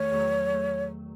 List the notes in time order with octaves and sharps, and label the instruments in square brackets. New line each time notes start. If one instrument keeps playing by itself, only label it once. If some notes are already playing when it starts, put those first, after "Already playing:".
Already playing: [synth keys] E2 D#3 A3 [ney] C#5
[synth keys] E2 D#3 F#3 A3
A3